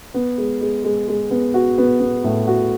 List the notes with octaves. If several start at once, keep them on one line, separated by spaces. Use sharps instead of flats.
B3
G#3
G#3
G#3
G#3
B3
F#4
B3
B3
A2
F#4